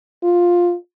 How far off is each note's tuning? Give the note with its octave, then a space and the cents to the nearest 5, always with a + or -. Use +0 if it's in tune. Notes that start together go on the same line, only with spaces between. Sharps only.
F4 +5